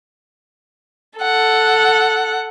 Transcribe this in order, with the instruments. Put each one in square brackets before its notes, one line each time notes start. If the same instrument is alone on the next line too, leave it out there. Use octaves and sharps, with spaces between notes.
[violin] A4 F#5